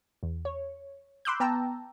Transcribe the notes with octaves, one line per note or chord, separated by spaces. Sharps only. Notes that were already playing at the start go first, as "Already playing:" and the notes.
E2
C#5
B5 C6 D6 E6 F#6 G6
B3 G5 A5 A#5 E6